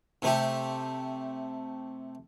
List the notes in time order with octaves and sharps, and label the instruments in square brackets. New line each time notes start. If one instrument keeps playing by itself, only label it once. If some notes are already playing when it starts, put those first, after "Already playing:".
[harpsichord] C3 A3 G4